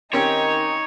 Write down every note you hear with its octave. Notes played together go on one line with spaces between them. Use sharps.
D#3 C4 C#4 D#4 G4 C#5